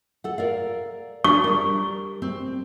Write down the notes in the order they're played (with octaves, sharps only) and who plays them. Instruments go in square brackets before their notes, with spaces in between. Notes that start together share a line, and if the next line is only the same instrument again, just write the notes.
[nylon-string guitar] A4 F#5
A#4 D5 F5
[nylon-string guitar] D4 [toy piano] C#6
[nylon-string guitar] G3 A#4
C4